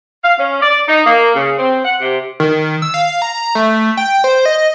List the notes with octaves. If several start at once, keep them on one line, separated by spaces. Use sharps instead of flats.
F5
C#4
D5
D#4
A#3
C#3
C4
F#5
C3
D#3
E6
F5
A#5
A3
G5
C5
D#5